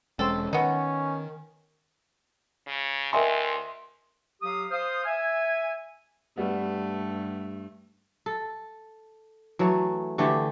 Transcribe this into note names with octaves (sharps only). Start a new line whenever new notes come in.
E1 G#3 C4 C#4 A4
D#3 B3 C#4 D#4
C#3
D2 A#4 D#5 E5 G5 G#5 C6
F#3 G4 F5 D#6
C5 F5 D#6
E5 G#5
G2 G3 A3 B3
A4
E3 F#3 A3
D3 E3 A3 G4